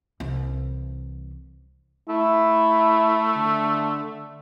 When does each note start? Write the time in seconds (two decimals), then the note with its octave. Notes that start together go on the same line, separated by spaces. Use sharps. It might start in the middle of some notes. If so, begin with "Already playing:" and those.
0.20 C2 E3
2.09 A3 E4
3.36 D3